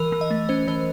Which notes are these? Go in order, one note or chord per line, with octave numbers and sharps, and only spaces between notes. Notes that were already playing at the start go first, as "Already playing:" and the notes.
Already playing: E3 A#4
E3
D#5
A3
C#4 C5
E3 C5